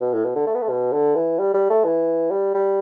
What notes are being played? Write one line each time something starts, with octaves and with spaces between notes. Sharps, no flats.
B2
A2
B2
D3
A3
B3
A3
B2
D3
E3
G3
G3
A3
E3
G3
G3